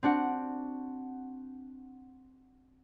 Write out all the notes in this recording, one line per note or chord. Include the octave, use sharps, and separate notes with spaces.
C4 D4 F#4 F#5